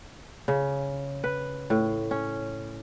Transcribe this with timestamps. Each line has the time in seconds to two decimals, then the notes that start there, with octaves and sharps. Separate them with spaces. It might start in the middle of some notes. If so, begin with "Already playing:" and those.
0.48 C#3
1.24 B4
1.70 A2
2.11 C#4